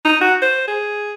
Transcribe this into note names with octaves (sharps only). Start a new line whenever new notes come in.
D#4
F#4
C5
G#4